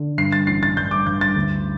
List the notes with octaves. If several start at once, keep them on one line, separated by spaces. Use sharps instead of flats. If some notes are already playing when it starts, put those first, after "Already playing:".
Already playing: D3
G2 C7
A6
A1 C7
A6
G2 G6
D6
G2 G6
A6
D2